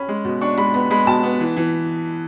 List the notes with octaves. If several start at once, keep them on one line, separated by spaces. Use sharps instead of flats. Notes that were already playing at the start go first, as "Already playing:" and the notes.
Already playing: C#4 B5
G#3
B2
D4 C#6
G#3 B5
B3 B5
G#3 B5
B2 A5
B3
E3
E3